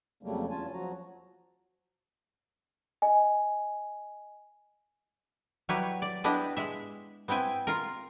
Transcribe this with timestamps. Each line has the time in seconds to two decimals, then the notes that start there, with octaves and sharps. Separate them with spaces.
0.23 F2 C#3 F#3 G3 A3 A#3
0.50 E2 C#4 F4 G#5 A5
0.73 F3 F#3 F#4 A#5
3.02 D#5 G#5
5.69 F#3 G3 E4 B4 C#5
6.02 D5
6.24 B3 D4 E4 G4 D#5
6.57 G#3 E5
7.28 B3 C4 E4 G5 G#5
7.67 F4 A#4